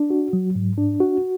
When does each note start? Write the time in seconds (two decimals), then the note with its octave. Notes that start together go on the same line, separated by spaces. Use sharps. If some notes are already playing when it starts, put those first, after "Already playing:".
Already playing: D4
0.10 F#4
0.33 F#3
0.55 G#2
0.78 D4
1.00 F#4